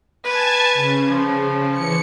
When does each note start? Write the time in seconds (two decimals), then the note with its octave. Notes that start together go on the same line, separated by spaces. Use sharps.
0.24 B4 G#5 A5 G#6
0.74 C#3
1.08 F3
1.72 E3 C#7